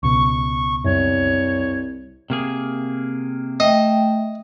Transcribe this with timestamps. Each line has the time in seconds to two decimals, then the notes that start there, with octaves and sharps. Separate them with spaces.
0.03 C#2 B2 C#6
0.85 C2 F#2 C#5
2.30 C3 A#3 G#4
3.60 A3 D#5 E5 G5